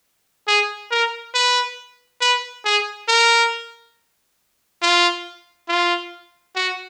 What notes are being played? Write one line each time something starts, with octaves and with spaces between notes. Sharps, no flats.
G#4
A#4
B4
B4
G#4
A#4
F4
F4
F#4